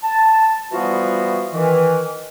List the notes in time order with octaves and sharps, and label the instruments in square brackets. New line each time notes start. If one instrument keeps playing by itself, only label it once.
[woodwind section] A5
E3 F3 G3 B3 F4 F#4
D#3 E3